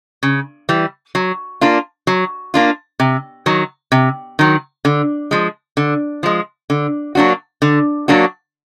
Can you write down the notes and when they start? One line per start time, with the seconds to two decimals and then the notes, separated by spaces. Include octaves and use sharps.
0.23 C#3
0.69 E3 G3
1.15 F#3
1.61 A#3 D4 F4
2.07 F#3
2.54 A#3 D4 F4
3.00 C3
3.46 D#3 F#3
3.92 C3
4.39 D#3 F#3
4.85 D3
5.31 F3 G#3
5.77 D3
6.23 F3 G#3
6.70 D3
7.15 F#3 A#3 D4 F#4
7.62 D3
8.08 F#3 A#3 D4 F#4